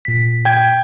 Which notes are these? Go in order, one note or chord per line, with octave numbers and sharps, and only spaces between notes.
A#2 B6
G5 G#6